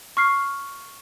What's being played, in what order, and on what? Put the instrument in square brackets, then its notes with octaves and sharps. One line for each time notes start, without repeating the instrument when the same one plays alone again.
[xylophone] C#6 F6 C7